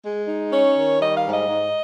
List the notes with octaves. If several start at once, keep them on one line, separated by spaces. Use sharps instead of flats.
G#3
D#4
C#4 C#5
D#3
G3 D#5
F5
G#2
D#5
G#2